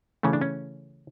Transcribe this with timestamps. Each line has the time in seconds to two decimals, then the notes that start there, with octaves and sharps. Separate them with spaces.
0.23 C#3 E3 A3 C#4
0.33 D4
0.41 C#4